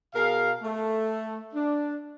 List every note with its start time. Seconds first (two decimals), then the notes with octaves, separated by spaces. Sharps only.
0.15 B2 G#4 A#4 F5
0.62 A3
1.55 D4